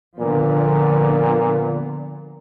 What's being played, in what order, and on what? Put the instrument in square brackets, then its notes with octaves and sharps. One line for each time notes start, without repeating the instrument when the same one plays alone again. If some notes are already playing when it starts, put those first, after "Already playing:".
[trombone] A#2 [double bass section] D3 F3 B3